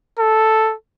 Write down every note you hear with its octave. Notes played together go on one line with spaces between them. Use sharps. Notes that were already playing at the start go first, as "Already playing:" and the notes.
A4